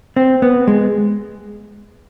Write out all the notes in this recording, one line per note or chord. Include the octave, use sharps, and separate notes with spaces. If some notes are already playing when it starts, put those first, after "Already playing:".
C4
B3
G#3